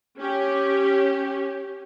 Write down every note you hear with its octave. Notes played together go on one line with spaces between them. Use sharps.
C#4 G4